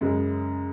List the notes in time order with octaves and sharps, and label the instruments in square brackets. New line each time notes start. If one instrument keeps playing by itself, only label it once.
[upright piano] F#2 C#3 G#3